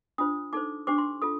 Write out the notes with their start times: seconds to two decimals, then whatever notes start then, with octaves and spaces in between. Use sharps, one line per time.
0.18 D4 F4 C5 D#6
0.53 D#4 A4 C5 D6
0.87 D4 G4 C5 D6
0.98 C6
1.22 F4 A4 D#6